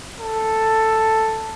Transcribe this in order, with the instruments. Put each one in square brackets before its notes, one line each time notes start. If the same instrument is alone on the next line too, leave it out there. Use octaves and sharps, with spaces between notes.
[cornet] A4